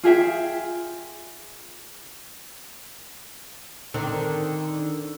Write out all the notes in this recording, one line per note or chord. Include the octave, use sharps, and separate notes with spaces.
F4 G#4 E5 G5
D3 D#3 C4